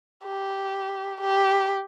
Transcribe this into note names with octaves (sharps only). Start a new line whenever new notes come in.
G4
G4